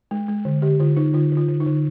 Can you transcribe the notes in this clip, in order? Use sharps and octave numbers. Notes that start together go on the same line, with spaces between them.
G#3
G#3
D3
D3 G4
D3 F4
D3 D#4
D3 F4
D3
F4
D3
D#4
D3